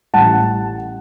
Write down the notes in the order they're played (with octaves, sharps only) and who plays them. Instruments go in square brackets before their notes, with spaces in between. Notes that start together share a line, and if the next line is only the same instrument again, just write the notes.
[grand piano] A1 A2 G3 F#5 A5